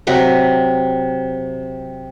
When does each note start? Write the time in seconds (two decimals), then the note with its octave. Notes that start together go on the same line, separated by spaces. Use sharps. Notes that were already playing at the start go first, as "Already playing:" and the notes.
0.07 C3 F#3 B4 A#5